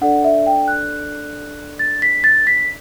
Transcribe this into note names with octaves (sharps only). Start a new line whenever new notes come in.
D4 A4 D5 F#5
E5
G5
F#6
A6
B6
A6
B6